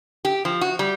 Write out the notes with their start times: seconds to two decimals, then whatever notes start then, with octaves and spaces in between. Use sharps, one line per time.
0.25 G4
0.45 F3
0.61 F#4
0.79 G3